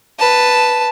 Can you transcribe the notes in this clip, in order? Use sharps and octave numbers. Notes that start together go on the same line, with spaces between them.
B4 A5